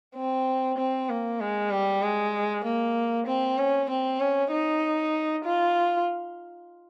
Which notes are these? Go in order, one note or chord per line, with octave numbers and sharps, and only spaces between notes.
C4
C4
A#3
G#3
G3
G#3
A#3
C4
C#4
C4
C#4
D#4
F4